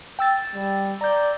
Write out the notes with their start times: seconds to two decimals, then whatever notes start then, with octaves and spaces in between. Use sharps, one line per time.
0.19 G5 E6 A6
0.55 G3
1.01 D5 A#5 G6